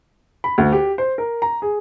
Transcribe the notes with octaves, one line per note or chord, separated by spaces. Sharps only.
B5
D2
G4
C5
A#4
A#5
G#4